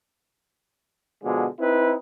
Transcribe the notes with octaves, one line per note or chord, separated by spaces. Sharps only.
B2 D3 F3 G#3
C4 D#4 E4 B4